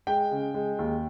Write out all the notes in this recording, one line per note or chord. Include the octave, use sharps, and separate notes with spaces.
G#3 G5
C#3
G#3
D#2